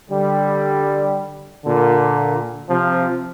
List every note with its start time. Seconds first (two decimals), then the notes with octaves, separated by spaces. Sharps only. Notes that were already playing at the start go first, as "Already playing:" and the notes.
0.10 D3 G3
1.65 A#2 D3
2.69 C3 F3